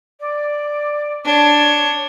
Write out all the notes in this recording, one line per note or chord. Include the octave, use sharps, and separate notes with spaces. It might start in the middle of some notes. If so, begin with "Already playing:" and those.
D5
D4 C#5